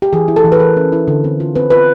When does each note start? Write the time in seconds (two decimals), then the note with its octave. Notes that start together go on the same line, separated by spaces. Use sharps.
0.02 G4
0.13 E3 G#4
0.28 E4
0.36 A4
0.44 E3
0.52 B4
0.60 E3 A#4
0.77 C#4
0.92 E4
1.08 D3
1.24 C4
1.40 F4
1.55 C4 B4
1.70 F4 B4